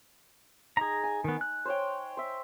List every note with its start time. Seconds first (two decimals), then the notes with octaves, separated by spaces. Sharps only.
0.77 D#4 G#4 A#5
1.04 G#5
1.24 D#3 B3
1.41 F#6
1.65 C5 C#5 G5
2.17 C5 E5